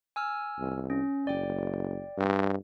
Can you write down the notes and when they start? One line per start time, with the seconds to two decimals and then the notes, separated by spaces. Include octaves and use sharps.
0.16 G#5 E6 F6
0.58 C2
0.90 C#4
1.27 F#1 D5 G5
2.17 G2